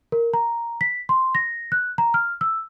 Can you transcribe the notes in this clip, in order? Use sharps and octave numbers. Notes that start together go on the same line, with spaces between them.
A#4
A#5
B6
C6
A#6
F#6
A#5
F6
E6